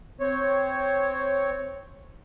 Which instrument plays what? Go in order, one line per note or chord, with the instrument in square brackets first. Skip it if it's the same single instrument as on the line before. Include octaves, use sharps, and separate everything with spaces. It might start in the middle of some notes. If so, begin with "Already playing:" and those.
[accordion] C4 C#5